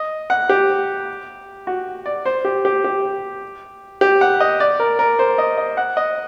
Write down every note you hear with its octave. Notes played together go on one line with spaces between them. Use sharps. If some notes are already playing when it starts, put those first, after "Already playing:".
Already playing: D#5
F#5
G4
F#4
D5
C5
G4
G4
G4
G4
F#5
D#5
D5
A#4
A#4
C5
D#5
D#5
F#5
D#5